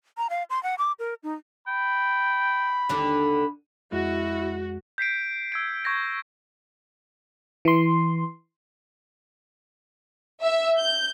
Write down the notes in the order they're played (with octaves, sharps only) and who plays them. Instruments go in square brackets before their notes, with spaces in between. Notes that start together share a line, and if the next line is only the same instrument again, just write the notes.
[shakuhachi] A#5
F5
C6
F#5
D6
A#4
D#4
[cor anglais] G5 [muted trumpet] B5
[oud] D#2 D3 D4
[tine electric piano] F2 G#3 [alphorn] E4 [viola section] F#4
[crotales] G6 B6 C7 D7
E6 G#6 D7
C#6 G6 G#6 A#6 D7
[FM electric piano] E3 C6
[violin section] E5
G6